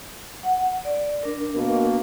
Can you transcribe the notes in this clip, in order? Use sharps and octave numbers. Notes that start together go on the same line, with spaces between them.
F#5
D5
D4 A#4
B2 A#3